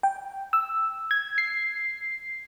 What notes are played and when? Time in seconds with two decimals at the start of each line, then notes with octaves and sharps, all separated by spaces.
0.03 G5
0.53 E6
1.11 G#6
1.38 C7